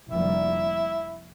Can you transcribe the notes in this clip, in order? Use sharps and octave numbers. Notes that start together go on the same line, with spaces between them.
F1 F2 D3 G3 A#3 E4